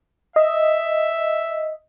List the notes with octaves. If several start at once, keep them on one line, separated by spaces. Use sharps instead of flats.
D#5 E5